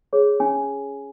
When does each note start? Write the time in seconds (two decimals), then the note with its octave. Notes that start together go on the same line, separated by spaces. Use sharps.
0.13 G#4 C#5
0.40 C#4 G#5